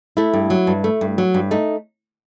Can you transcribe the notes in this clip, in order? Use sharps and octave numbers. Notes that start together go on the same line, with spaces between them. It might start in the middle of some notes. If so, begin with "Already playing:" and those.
A3 E4
G2
F#3
G2
A3
G2
F#3
G2
A3 D#4